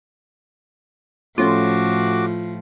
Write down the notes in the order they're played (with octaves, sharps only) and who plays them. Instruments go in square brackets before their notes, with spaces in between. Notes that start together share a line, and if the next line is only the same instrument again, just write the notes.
[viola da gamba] A2 F3 [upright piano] A3 C#4 [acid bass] F4 [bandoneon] F#4 D6